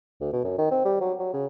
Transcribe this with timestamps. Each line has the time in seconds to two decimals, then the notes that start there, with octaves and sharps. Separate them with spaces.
0.21 D2
0.33 B2
0.44 F#2
0.58 D#3
0.71 C4
0.85 G3
1.01 F#3
1.20 F#3
1.34 C#3